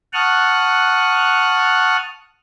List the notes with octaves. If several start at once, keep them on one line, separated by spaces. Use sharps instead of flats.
F#5 A5 C#6 D#6 F6 F#6